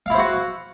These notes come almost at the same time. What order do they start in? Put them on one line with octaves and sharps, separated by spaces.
F5 E4 C5 F#4